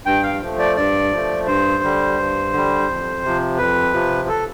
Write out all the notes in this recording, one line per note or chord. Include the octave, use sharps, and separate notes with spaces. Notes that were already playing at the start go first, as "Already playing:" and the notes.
G2 G5
F5
F3 A3
D5
G2 D5
F3 A3
G2 C5
D3 G3
G2
D3 G3
F2
C3 F3
F2 B4
C3 F3
A4